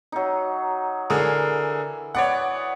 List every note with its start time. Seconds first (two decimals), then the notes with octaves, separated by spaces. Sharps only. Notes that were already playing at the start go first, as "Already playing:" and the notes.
0.12 F#3 D#4
1.10 D3 E3 G#4 A#4
2.15 B3 C#5 D5 F#5